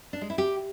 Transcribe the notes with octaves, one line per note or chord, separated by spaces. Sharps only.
D4
G#3
E4
G4